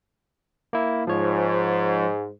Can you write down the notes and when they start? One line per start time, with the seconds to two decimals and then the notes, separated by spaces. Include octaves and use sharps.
0.73 A#3 E4
1.07 G#2 F3 C#5